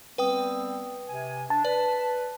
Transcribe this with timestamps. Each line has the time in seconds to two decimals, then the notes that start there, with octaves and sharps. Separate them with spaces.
0.18 G3 B3 C4 B4 G5 D#6
1.09 C3 G#5
1.50 D4 A5
1.65 B4 D5